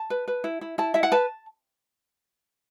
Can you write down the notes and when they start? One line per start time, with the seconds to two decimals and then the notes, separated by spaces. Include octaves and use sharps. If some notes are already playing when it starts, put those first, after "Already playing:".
Already playing: A5
0.10 B4
0.28 B4
0.44 E4
0.61 E4
0.78 E4 A5
0.94 E4 E5
1.03 F#5
1.12 B4 A5